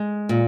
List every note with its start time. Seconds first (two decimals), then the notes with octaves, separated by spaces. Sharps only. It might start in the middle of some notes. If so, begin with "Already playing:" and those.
Already playing: G#3
0.29 A#2